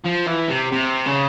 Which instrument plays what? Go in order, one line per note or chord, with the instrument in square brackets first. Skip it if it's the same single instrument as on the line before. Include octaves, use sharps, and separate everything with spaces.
[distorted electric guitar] F3
E3
C3
C3
C#3